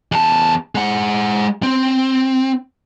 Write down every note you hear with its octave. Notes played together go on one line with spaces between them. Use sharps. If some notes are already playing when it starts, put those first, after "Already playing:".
E2 A5
G#3 F#5
C4